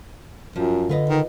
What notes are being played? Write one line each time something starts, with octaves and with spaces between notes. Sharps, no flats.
F#2 F3
D3 F4 B4 D#5
D#3